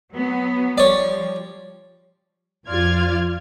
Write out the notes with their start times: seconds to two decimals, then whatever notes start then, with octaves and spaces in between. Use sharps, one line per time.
0.12 F#3 B3
0.78 F3 G3 C#5 D5
2.66 F2 F3 F4 D5 F6 G#6